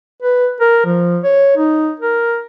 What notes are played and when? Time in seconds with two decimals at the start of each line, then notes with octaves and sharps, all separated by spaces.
0.22 B4
0.60 A#4
0.85 F3
1.24 C#5
1.57 D#4
2.00 A#4